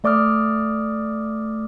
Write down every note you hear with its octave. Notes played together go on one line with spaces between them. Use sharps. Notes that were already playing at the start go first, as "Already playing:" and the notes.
A3 D5 D6 D#6 F6